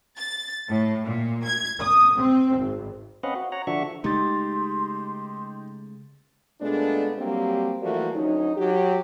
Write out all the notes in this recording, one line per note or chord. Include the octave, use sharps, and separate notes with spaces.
A6
A2
A#2
G#6
D#6
C4
G#1
C4 C#4 B4 D#5 F5 F#5
F#4
C#5 F#5 A#5
D3 F3 D4 F#4 E5 C#6
C#3 G#3 A3 D#4 G4 C6 A6
A#2 G#3 A3 B3 D4
F#3 G3 A#3 C4 G4
E3 F3 G3 A3 A#3 F#4
D2 F#3 C#4 D#4
F#3 G4